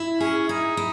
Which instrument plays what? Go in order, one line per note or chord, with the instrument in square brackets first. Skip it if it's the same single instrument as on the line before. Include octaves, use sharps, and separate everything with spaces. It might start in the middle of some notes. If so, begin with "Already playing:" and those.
Already playing: [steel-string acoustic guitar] E4
[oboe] C#4 [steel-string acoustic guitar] G#4
[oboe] D#4 [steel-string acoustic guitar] E4
[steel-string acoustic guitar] E4